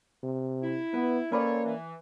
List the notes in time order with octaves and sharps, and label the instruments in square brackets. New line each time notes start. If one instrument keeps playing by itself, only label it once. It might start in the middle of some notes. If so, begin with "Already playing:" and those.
[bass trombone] C3
[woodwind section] E4
[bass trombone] B3 [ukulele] B4
[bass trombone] A#3 [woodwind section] C4 A4 C#5 [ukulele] C#4 B4 D5
[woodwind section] E3